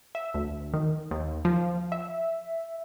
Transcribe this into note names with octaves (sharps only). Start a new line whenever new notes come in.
E5
D2
D#3
D#2
F3
E5